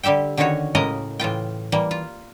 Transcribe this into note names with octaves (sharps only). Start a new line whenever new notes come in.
D3 G3 G4 E5 G5
D3 D#3 C#4 D#4 F#4 C#5
A2 C#3 G#3 A#3 A#4 D#5
A2 E3 F4 G5
E3 G3 A#3
F4